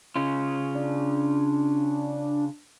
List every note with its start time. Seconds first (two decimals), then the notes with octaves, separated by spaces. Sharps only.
0.16 C#3 C#4 F4
0.75 D4